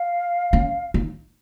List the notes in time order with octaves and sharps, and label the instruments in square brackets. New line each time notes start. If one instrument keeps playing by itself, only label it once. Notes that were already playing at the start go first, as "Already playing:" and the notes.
Already playing: [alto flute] F5
[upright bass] C#4
D#4